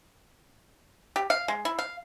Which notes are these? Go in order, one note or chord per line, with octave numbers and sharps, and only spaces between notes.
G4
F5
G#3
E4
F5